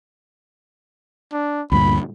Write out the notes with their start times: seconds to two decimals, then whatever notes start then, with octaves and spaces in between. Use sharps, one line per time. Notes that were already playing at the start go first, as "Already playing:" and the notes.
1.33 D4
1.72 D2 G2 A#2 B5